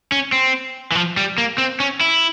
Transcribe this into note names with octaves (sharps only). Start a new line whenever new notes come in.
C#4
C4
E3
F3
G3
A#3
C4
C#4
E4